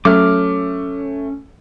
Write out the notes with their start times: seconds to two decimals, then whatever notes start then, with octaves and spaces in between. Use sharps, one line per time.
0.05 F#3 A3 C#4 D6 F6